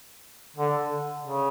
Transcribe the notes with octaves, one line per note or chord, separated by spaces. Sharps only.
D3
C#3